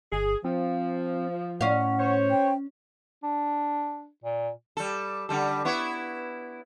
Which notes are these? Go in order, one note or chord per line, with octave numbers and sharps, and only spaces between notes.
G1 G#4
F3 C4
A2 C#4 F5 F#5
C5 C#5
G5
D4
A#2
G3 A4
D3 G3 A4
B3 E4 C#5